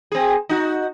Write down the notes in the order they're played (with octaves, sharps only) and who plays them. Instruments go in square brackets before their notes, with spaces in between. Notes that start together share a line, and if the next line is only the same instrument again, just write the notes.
[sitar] C4 G#4
D#4 F#4